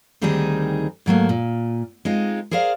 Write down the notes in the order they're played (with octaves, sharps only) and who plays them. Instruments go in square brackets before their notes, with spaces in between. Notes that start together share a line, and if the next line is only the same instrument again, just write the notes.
[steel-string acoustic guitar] D2 D#3 G3 C4 D#4 G#4
G#2 F#3 A3 A#3
A#2
G#3 C4 D#4 F4
G#4 A#4 C5 D5 F5